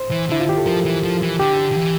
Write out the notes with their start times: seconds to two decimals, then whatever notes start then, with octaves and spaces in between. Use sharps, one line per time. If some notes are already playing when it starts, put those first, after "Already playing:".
Already playing: C5
0.11 E3
0.29 D3 E4
0.40 F4
0.49 G4
0.58 A4
0.66 F3 A#4
0.85 E3
1.04 F3
1.22 E3
1.39 D3 G4
1.71 D3
1.76 E3